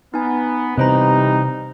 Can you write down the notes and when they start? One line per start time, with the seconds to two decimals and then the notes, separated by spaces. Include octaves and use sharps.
0.14 B3 D#4 G#5
0.78 C3 E3 G3 D#4 B4 C5 A#5